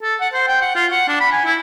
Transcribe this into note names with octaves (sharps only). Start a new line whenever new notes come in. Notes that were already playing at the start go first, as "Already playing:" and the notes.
A4
F#5
C5
G5
F#5
F4
F#5
D4
B5
G#5
E4